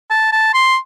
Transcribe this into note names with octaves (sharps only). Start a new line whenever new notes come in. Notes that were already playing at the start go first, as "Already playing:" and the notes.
A5
A5
C6